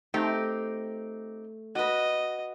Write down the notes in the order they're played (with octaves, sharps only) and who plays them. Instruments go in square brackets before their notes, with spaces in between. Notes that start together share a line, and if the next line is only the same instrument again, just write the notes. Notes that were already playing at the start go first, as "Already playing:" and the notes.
[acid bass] A3 [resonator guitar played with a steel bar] C4 D#4 G4
[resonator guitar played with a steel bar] F#4 B4 [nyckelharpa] D#5